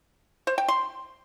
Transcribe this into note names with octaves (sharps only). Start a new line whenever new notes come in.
C5
G5
C6